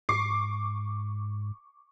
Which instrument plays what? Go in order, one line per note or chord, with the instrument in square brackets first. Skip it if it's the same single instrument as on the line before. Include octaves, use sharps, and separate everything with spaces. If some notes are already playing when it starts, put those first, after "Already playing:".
[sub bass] G#2 [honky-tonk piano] C#6 D6 C7